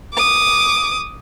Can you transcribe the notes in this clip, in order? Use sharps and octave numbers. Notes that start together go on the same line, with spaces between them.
D6 D#6